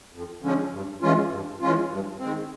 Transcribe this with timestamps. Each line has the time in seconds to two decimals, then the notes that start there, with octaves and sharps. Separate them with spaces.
0.13 F2
0.42 D3 F3 G#3 C#4
0.71 G2
1.02 E3 G#3 C#4 F4
1.30 G2
1.61 E3 G#3 C#4 F4
1.90 G2
2.19 D#3 G#3 C4